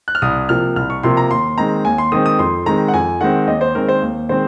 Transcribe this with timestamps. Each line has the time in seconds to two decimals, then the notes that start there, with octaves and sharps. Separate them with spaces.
0.08 F#6
0.15 F6
0.22 C2 D#6
0.49 C3 F3 A#3 F6
0.76 C2 F6
0.90 C#6
1.03 C3 F3 A#3 C6
1.17 A#5
1.31 D#2 C6
1.58 D#3 G#3 C4 A#5
1.85 D#2 G#5
1.98 C6
2.12 D#3 G#3 C4 D#6
2.26 D#6
2.39 F2 C6
2.66 D#3 G#3 C4 A#5
2.88 F#5
2.93 F2 G#5
3.21 D#3 G#3 C4 F#5
3.47 D#2 D#5
3.61 C5
3.75 D#3 G#3 C4 A#4
3.88 C5
4.02 D#2
4.29 D#3 G#3 C4 C5